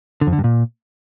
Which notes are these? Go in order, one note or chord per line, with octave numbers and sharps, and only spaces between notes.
D3
F2
D3
G2
A#2